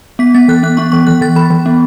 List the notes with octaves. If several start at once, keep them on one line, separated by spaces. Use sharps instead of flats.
B3 B6
B3 A6
E3 F#6
B3 F#6
B3 C#6
E3 C#6
E3 F#6
E3 A6
E3 B5
E3
B3